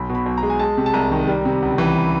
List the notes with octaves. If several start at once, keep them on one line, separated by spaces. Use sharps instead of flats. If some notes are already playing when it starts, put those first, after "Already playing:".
Already playing: B1 B5
B2
B5
B1
A#5
G#3
G#5
G#3 A5
C3
A5
C2 A#5
D#3
G3
C3
C#2
E3